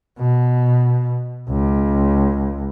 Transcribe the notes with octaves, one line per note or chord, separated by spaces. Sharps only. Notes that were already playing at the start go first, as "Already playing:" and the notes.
B2
C#2